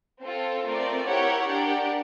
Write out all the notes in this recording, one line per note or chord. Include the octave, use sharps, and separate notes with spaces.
C4 F4 A4
A3 C4 F4 A#4 D5
E4 G4 A#4 C#5 F#5
D4 G4 A#4 D5 F#5